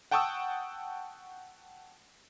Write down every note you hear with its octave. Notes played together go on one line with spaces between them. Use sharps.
F#5 G5 A5 C#6 D#6 E6